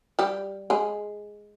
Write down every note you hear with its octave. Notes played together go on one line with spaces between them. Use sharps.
G3 G4
G#3 G#4